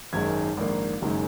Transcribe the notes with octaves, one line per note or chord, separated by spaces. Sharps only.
G#1 F#2 D#3 G#3 G#6
A#1 G#2 D#3 A#3
F#1 F#2 D#3 G#3